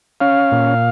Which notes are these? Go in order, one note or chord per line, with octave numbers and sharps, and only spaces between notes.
C#4 F5
A#2